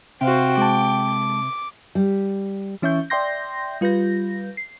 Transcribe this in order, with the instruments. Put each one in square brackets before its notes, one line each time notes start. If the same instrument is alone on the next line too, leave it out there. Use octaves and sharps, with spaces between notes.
[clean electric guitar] C3 [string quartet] F#4 C5 F5 [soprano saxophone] G5
[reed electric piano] G#3 A5 [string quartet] D6
[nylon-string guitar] G3
[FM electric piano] E3 C#4 E5 C#6 G6
D5 E5 G5 C6 G6 A#6
G3 F4 B4 G6 A#6
C7